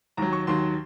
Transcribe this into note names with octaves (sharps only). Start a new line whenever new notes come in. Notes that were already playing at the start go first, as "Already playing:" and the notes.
D#2 D#3 F#3 A#5
C#6
D#2 D#3 F#3 C6